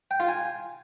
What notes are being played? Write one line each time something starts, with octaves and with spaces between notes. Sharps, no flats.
G5
F4
G#5